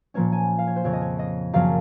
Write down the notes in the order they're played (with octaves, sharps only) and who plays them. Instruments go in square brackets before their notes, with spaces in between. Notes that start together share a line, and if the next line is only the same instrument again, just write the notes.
[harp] A#2 F3 A#3 C#4 C#5
G#5
F5
C#5
C5
F2 C#3 F3 C#5
D#5
C#5
D#5
F#2 C#3 F3 A#3 F5